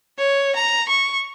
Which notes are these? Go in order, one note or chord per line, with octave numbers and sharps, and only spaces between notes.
C#5
A#5
C#6